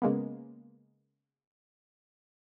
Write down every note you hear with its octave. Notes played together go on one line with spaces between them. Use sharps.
C#3 G#3 A#3 B3